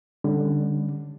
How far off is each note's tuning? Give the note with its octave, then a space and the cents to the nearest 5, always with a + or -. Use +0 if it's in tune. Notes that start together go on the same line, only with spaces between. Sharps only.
D3 +10 G3 +35 C#4 +0